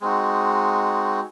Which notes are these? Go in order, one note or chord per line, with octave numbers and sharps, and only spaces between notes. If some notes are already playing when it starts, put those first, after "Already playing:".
G#3 C4 D#4 F#4